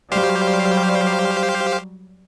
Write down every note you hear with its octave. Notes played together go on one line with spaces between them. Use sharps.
F#3 G3 G4 C5 F5